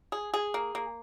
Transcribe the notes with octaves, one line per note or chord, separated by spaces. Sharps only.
G#4
G#4
A#3
A#3